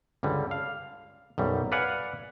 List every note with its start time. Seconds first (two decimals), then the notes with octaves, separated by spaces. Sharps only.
0.23 C#2 G2 D3 G3
0.51 F5
1.38 B1 F#2 G3
1.72 B4 D5 F5 F#5 G#5